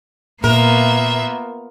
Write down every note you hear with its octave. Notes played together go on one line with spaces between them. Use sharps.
A#2 A#3 B3 F4 A#4 E5